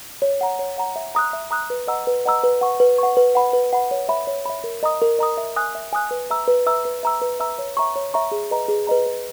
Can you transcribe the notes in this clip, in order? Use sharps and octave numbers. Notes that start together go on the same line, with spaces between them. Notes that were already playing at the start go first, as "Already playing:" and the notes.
C#5
F#5 A#5
C#5
F#5 A#5
E5
A#5 D#6 F#6
E5
A#5 D#6 F#6
B4
D#5 F#5 A#5 E6
B4
D#5 F#5 A#5 E6
B4
F#5 C#6
B4
F#5 C#6
B4
F#5 B5
B4
F#5 B5
C#5
E5 B5
C#5
E5 B5
A#4
D#5 A#5 D#6
A#4
D#5 A#5 D#6
E5
G#5 D#6 F#6
E5
G#5 D#6 F#6
B4
E5 A#5 E6
B4
E5 A#5 E6
B4
E5 A#5 E6
B4
E5 A#5 E6
C#5
E5 A#5 C#6
C#5
E5 A#5 C#6
G#4
B4 D#5 A#5
G#4
B4 D#5 A#5
B4